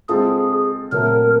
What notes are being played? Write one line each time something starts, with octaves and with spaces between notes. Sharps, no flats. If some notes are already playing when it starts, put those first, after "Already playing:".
G#3 C4 F4 G#4 A4
A#2 F#3 A3 C4 A#4